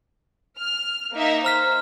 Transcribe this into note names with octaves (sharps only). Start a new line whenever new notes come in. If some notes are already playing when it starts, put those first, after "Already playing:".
F6
A#3 D#4 E5
C5 A#5 F6 B6